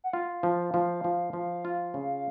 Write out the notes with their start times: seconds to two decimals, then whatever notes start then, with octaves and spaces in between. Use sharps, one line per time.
0.04 F#5
0.13 F4 F5
0.43 F3
0.74 F3
1.04 F3
1.33 F3
1.65 F4
1.94 C#3